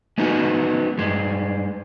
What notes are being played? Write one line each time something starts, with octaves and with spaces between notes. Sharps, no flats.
G#3 B3 C#4 D#4 F#4
G2 G#3